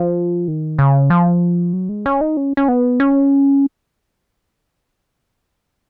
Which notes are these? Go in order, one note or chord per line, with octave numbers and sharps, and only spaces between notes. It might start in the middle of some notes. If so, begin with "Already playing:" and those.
Already playing: F3
D#3
C#3
F3
F#3
G#3
C#4
D#4
C#4
C#4
B3
C#4